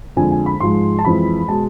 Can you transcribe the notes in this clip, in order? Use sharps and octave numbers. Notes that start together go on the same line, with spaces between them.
F2 D3 G#3 G#5
G#5
B5
G#2 F3 G#3 C6
A5
F2 E3 G#3 B5
B2 G#3 A5